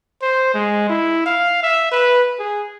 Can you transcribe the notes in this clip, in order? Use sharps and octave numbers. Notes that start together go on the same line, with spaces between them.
C5
G#3
E4
F5
E5
B4
G#4